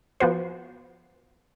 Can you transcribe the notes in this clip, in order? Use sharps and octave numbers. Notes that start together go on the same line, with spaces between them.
F3 B3 F#4 C5